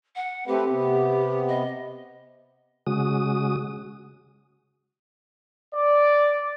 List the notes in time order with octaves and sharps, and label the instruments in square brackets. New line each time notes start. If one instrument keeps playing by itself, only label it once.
[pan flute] F#5
[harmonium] A3 C4 B4 [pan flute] G4
[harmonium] C3 B3
[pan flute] D#5
[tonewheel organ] C#3 G#3 F#4 D#6
[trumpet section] D5